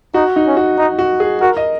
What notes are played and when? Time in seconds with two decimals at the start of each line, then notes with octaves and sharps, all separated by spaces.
0.14 D#4 F#4
0.36 D#4
0.46 C#4
0.57 F#4
0.78 D#4
0.99 F#4
1.20 G#4
1.41 F#4 A#4
1.57 D#5